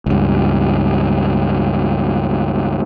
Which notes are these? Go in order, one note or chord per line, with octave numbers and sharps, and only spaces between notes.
C#2 G2